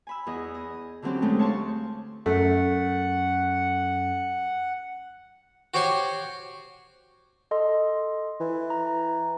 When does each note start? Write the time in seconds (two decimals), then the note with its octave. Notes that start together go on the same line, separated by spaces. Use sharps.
0.07 G#5 B5 E6
0.27 E2 G#4 D#5
0.54 D#5
1.02 D3 E3 F#3 C4 C#4 G4
1.22 D2 G#3 A3 G4
1.39 C#5 F5 A5 C6 C#6
2.26 F#2 A3 F#5
5.74 F#4 G4 C5 C#5 C6 C#6
7.51 A4 D#5 C6
8.40 E3
8.70 A#5